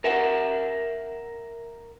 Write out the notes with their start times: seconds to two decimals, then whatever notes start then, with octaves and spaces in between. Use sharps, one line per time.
0.04 A#4 E5 F#5